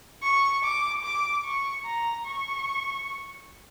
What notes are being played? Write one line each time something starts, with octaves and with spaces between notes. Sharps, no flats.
C#6
D6
D6
C#6
A#5
C#6